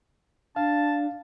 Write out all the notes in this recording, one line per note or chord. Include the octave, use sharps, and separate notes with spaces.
D4 F5 A5